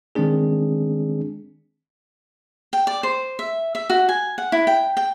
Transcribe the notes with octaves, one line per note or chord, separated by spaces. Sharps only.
D#3 G#3 C4 D4 G#4
G5
D5
C5
E5
E5
F#4
G#5
F#5
E4
G5
G5